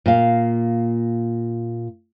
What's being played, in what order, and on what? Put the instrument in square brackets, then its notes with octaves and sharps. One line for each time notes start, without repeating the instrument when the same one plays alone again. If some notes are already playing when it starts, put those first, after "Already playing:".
[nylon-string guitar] A#2 F5